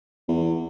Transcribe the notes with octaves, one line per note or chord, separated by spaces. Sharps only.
E2